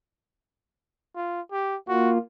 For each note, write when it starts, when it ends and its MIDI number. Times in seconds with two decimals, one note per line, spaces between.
1.16 1.41 65
1.52 1.77 67
1.89 2.18 58
1.89 2.18 65
1.89 2.12 66